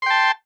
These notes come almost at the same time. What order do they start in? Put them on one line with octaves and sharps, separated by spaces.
C6 G5 A5